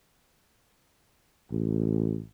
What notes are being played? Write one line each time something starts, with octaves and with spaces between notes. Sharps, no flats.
A1